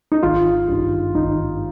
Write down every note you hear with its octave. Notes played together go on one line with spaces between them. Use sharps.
D#4
G#1 F4
G2 D#3
G#1 D#4